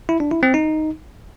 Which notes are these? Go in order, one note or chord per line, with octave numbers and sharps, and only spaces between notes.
E4
D4
E4
C4
D#4